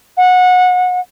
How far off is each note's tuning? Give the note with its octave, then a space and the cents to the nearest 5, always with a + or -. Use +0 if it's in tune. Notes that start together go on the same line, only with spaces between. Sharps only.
F#5 -25